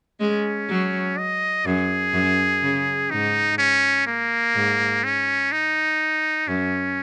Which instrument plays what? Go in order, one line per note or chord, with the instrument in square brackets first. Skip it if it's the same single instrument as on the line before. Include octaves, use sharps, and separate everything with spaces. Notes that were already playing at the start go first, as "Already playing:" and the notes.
[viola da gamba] G#3 [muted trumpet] C#4
[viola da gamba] F#3
[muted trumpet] D#5
[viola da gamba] F#2 [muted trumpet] G#4
[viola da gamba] F#2
C#3
[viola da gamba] G#2 [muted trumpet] D#4
[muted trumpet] C#4
A#3
[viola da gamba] G#2
[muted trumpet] C#4
D#4
[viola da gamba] F#2 [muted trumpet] C#4